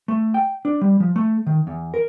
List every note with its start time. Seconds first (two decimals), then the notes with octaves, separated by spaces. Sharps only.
0.08 A3
0.34 G5
0.65 D4
0.81 G3
1.00 F3
1.16 A3
1.47 D#3
1.67 E2
1.94 A#4